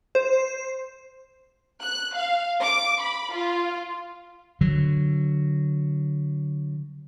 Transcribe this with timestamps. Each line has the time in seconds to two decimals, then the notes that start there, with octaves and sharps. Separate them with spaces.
0.15 C5
1.82 F#6
2.15 F5
2.64 D6
3.01 B5
3.34 F4
4.61 D3 F#3